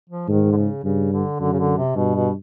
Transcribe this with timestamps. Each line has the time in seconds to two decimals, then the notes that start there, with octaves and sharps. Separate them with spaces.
0.09 F3
0.28 G#2 D#3
0.52 D3
0.56 C#3
0.83 G2 C#3
1.12 D3
1.40 F#2 D3
1.53 C#3
1.59 D3
1.78 C3
1.95 G2 B2
2.15 B2